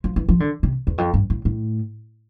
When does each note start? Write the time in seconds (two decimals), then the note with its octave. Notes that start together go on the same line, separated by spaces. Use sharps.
0.04 F3
0.16 E3
0.29 F3
0.40 D3
0.63 C3
0.87 E2
0.98 F2
1.14 G2
1.30 A2
1.45 A2